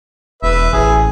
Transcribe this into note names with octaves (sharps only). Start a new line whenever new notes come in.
E1 B4 E5
A1 G#4